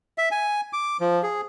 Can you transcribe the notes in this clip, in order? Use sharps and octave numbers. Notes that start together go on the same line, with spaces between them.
E5
G#5
D6
F3
G#4